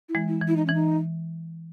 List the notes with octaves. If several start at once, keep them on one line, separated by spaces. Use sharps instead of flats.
E4
E3 G#3
E4
E3
E4
D#4
E3 C#4
D#4